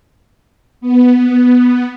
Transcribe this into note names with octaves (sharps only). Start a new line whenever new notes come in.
B3